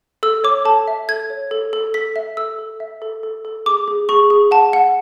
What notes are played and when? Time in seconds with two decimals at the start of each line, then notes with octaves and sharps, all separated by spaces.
0.23 A4 E6
0.44 C#5 D6
0.65 A4 A5
0.88 E5
1.08 A4 G#6
1.30 C#5
1.51 A4
1.73 A4
1.94 A4 B6
2.16 E5
2.37 A4 E6
2.59 A4
2.80 E5
3.02 A4
3.23 A4
3.45 A4
3.66 G#4 D6
3.88 G#4
4.09 G#4 C#6
4.30 G#4
4.51 F#5 A5
4.73 F#5